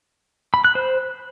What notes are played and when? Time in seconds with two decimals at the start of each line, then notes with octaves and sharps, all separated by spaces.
0.54 B5
0.64 F#6
0.75 C5